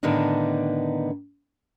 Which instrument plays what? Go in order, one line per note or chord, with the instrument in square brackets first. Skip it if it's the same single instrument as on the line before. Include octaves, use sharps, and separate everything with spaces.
[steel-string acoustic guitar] A2 D3 D#3 B3 D4 D#4